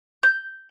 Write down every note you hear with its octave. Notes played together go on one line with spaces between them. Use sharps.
G6